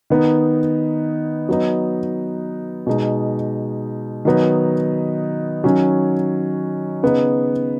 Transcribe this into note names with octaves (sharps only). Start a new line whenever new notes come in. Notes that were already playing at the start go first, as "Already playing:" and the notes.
D#3 B3 D#4
F#3 B3 D#4
B2 G#3 D#4
D#3 F#3 B3 D#4
D#3 F#3 C#4
C#3 B3 D#4